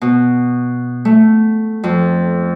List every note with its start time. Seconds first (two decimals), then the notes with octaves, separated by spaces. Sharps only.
0.02 B2
1.05 A3
1.84 F2